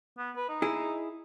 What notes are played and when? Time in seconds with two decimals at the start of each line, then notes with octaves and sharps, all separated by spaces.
0.18 B3
0.36 B4
0.49 D#4
0.62 E4 G#4